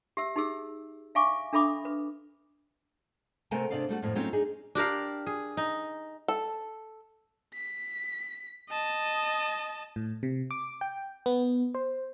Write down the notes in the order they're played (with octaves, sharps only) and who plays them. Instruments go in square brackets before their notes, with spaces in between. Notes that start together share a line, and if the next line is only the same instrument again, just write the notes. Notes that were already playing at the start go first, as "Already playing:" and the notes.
[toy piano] G4 E5 E6
D#4 G4 G#4 E6
E5 F5 G#5 C#6 D6
D4 A4 E5 B5 D6 D#6
B4
[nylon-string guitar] C3 A3 A4 A#4 G5 G#5
C3 D4 D5 D#5 F5
G3 A3 F#4
F2 A2
F#3 A3 C4 C#4 D#4 F4
D4 D#4 G#4
[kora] D4 G4 A#4 F5
G#4
D#4
[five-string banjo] A4
[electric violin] B6
D#5 A5
[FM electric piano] A2
C3
D6
G5
B3
C5